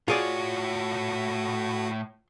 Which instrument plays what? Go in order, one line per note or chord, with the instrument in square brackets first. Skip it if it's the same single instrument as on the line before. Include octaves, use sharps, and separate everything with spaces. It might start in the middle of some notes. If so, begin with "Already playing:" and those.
[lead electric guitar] A2 C#5 [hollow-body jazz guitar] F4 G#4 D5 [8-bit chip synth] F#4